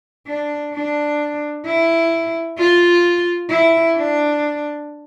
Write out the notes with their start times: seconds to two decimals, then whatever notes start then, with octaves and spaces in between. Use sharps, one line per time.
0.27 D4
0.74 D4
1.66 E4
2.58 F4
3.49 E4
3.96 D4